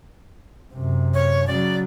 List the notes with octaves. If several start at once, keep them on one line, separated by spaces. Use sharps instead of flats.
F#2 C3
C#5
C#3 F#3 D5